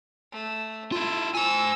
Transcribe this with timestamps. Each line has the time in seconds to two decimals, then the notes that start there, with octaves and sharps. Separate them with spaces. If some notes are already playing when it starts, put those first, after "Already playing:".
0.32 A3
0.92 E4 F4 A4
1.35 C5 G#5 E6